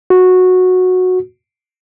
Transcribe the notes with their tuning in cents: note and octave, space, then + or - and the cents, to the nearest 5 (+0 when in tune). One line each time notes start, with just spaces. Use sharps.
F#4 -10